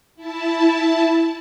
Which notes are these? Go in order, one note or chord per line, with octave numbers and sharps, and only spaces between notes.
E4 A5